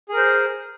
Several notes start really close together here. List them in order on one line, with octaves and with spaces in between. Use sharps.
G#4 A#4 C5